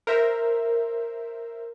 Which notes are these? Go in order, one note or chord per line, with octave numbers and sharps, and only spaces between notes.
A#4 C5 E5